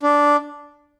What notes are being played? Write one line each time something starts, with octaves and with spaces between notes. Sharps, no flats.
D4